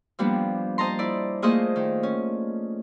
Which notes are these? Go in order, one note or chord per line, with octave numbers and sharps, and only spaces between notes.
F3 G3 A#3 B3 D4
C5 D#5 A5 A#5 C6
E4 D5
A3 A#3 F4 G#4 C5 D#5
D#3
C#4